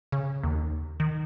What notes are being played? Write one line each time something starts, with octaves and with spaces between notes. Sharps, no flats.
C#3
D#2
D#3